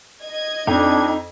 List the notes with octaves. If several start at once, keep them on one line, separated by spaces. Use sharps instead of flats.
D#5 G#6
F2 D4 D#4